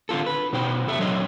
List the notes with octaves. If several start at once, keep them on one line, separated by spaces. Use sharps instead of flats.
D3 A#3 F4 A4
B4
B2 D#4 C5 G5
C3 A4 E5
F#3 D4 C5 C#5 D#5